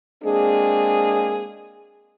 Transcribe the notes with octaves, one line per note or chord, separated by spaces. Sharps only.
G#3 A#3 C4 D4 G#4